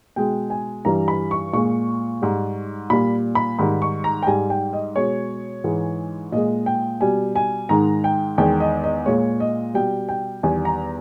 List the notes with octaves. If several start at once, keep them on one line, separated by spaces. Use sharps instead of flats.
B2 G#3 G5
G#5
G2 E3 G3 A#5
B5
C#6
A#2 G#3 C#6
G#2 G3
A#2 G3 B5
B5
G#2 D#3 G3 B5
C#6
A#5
G5
G#2 G3 G#5
G5
D#5
B2 G#3 C#5
G#2 E3 G#3
A#2 G#3 D#5
G5
B2 G3 G#5
G#5
G#2 D#3 G#3 A#5
G5
E2 D#3 G#3 G5
D#5
D#5
A#2 G#3 C#5
D#5
B2 G3 G5
G5
E2 D#3 G3 G#5
A#5